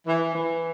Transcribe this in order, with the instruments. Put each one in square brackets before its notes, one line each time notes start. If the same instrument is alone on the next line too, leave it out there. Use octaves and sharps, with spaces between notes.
[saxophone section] E3
E3